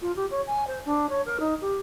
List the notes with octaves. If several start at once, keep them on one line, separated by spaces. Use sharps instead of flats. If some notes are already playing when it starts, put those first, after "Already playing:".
F4
G4
C#5
G#5
C5
D4
C#5
A#4
D#4
G4